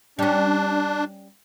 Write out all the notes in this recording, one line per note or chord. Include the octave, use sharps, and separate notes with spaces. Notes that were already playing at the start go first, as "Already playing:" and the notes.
G3 C#4 D4